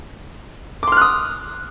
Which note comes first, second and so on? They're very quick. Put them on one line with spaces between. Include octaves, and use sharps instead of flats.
D6 C6 F6 F#6 D#6